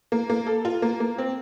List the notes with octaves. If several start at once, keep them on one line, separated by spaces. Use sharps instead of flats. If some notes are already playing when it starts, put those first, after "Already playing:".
A#3
A#3
A4
F4
A#3
A#3
C4